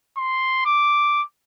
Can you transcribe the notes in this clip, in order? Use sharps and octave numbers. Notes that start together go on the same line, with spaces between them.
C6
D6